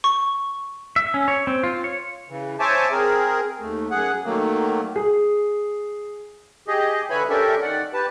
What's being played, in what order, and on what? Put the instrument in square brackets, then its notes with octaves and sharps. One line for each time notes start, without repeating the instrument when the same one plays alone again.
[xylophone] C#6
[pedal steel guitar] E5
C#4
C#5
C4
F4
C#5
[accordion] C#3 E3
C5 C#5 E5 G#5 A5 D6
C4 G#4 A#4
D#2 A3
F#2 G#4 F#5
D#3 F#3 A3 A#3
[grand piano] G#4
[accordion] G4 G#4 D#5
D3 B4 C#5 E5 G#5 B5
C#4 D4 G4 A4 A#4 E5
D#3 D5 F#5
G4 B4 A5